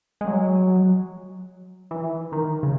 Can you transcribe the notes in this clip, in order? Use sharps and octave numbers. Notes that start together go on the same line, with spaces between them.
G#3
F#3
E3
D#3
C#3